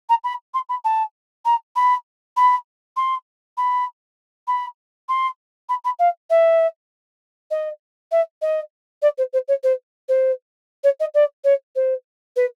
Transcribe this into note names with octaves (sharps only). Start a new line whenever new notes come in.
A#5
B5
C6
B5
A5
A#5
B5
B5
C6
B5
B5
C6
B5
B5
F5
E5
D#5
E5
D#5
D5
C5
C5
C#5
C5
C5
C#5
D#5
D5
C#5
C5
B4